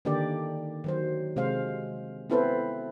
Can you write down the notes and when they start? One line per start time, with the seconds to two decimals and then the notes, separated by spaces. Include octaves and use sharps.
0.05 D3 D#3 A#3 D4 G4 D5
0.84 D#3 F#3 C5
1.36 C3 G#3 C5 F5
2.30 B3 C4 E4 A4 B4 C5